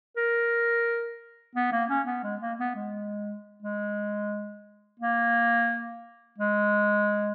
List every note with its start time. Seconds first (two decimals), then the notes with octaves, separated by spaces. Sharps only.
0.17 A#4
1.55 B3
1.72 A#3
1.89 C#4
2.06 B3
2.24 G#3
2.41 A#3
2.59 B3
2.75 G#3
3.62 G#3
5.00 A#3
6.38 G#3